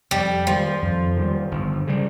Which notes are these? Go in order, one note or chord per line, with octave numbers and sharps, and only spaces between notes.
F2 G3
D#3 F3 G3
F2
D#3 G3
G1
C#3 G3